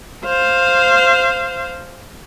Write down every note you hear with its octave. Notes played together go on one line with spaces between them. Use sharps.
C5 F5